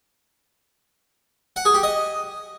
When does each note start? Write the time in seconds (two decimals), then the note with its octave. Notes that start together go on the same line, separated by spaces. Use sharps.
1.56 F#5
1.65 G#4
1.74 G4
1.83 D#5